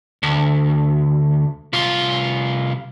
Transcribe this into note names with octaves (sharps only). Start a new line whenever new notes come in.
D2
C2 F4